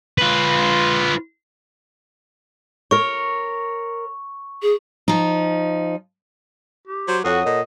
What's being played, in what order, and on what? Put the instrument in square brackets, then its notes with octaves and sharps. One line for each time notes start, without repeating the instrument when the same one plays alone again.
[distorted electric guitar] F4 B4
[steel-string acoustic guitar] A#4 C#5 [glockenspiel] C#6
[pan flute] G#4
[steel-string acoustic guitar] F3 D#4
[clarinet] G4
[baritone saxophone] F#3 [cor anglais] C5
[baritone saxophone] F2 [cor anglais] F#4 [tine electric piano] A4 C#5 F#5 [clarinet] D#6
[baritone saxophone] A#2 [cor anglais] D#5